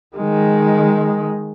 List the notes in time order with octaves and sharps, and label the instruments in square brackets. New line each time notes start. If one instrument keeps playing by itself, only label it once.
[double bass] D#3 G#3